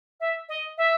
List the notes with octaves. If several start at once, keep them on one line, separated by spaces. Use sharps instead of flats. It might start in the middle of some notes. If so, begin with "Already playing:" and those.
E5
D#5
E5